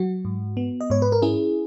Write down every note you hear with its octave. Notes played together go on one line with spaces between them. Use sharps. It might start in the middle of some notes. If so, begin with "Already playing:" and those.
Already playing: F#3 F#4
G#2
B3
D#5
G#2 C#5
B4
A#4
C#4 E4 G#4